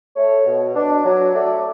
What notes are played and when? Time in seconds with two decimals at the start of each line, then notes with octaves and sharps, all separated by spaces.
0.16 A3 C#5
0.46 B2
0.75 D4
1.05 F#3
1.35 A3 D5